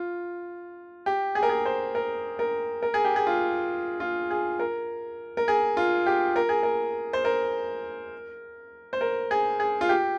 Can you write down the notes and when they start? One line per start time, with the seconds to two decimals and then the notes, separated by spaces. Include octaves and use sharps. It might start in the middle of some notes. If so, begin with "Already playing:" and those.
Already playing: F4
1.06 G4
1.35 G#4
1.43 A#4
1.50 G#4
1.65 C5
1.95 A#4
2.39 A#4
2.82 A#4
2.94 G#4
3.05 G4
3.16 G#4
3.27 F4
4.00 F4
4.31 G#4
4.59 A#4
5.37 A#4
5.48 G#4
5.77 F4
6.06 G4
6.36 A#4
6.49 G#4
6.63 A#4
7.13 C5
7.25 A#4
8.93 C5
9.01 A#4
9.31 G#4
9.60 G#4
9.81 F4
9.89 G4